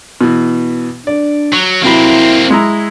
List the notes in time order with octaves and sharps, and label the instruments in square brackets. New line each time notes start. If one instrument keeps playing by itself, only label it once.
[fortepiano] B2 E3
[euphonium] D4 [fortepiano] D5
[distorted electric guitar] F#3
[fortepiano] C3 F#3 B5 [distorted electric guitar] A#3 C4 [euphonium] E4
[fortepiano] G#3 E4 A#5